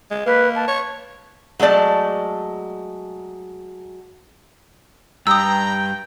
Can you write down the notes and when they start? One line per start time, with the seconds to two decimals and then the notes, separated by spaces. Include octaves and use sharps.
0.11 G#3
0.26 A#3 B4
0.56 A5
0.68 C#5
1.59 F#3 G#3 A3 D5 A5
5.27 G2 G5 A#5 D#6 E6